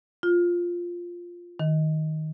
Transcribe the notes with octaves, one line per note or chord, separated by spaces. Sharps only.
F4
D#3